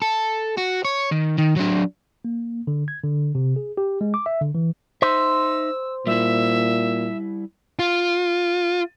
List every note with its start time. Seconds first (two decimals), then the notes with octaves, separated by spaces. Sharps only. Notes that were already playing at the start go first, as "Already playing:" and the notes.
0.02 A4
0.58 F#4
0.85 C#5
1.11 D#3
1.38 D#3
1.56 F#3 D4
2.25 A#3
2.67 D3
2.88 G#6
3.03 D3
3.35 C3
3.56 G#4
3.77 G4
4.01 G#3
4.14 D6
4.26 E5
4.41 D3
4.55 E3
5.02 D#4 C5 E5 E6
6.07 A#2 G3 E4 E5
7.79 F4